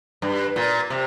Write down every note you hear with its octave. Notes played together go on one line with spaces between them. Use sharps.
G2
A#2
C3